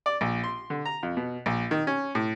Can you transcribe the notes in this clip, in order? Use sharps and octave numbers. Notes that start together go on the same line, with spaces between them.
D5
A#1
C6
D3
A#5
F2
B2
A#1
D#3
C#4
A2